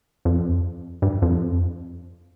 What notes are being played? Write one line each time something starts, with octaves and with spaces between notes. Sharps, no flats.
F2
G2
F2